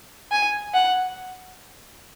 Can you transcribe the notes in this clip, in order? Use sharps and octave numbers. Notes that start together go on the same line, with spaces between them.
G#5
F#5